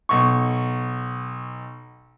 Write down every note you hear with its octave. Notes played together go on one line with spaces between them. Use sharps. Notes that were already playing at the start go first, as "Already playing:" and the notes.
B1 C#6